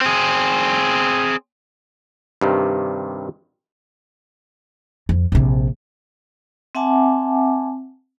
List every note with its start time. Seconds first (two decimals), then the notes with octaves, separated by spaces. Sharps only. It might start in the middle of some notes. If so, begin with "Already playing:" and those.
0.01 C4 G#4
2.41 G2 C3 D#3
5.09 F2
5.32 A#1 C3
6.75 C4 E5 F#5 G#5 A5 D6